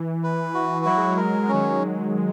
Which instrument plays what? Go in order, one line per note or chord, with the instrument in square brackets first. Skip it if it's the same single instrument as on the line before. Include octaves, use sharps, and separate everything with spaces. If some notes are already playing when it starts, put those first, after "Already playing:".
Already playing: [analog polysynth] E3
[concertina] B4
F#4
[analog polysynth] F#3 [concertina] E4
[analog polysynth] G#3
F#3
[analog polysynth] G#3 [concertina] A#4
[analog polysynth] F#3
G#3
[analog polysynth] D#3 F#3 [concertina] C#4